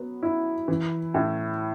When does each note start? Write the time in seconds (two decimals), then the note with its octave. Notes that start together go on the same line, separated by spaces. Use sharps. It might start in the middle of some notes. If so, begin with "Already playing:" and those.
Already playing: F#3 B3
0.23 E4
0.68 E3
1.14 A2